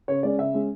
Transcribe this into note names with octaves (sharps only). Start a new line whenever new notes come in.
C#3 C#5
G#3 C#4 D5
C#3 E5
G#3 C#4